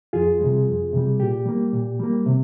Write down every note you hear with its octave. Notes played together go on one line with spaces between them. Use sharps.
F2 F4 G#4
C3 G3
F2
C3 G3
A#2 G4
G3 A#3
A#2
G3 A#3
C3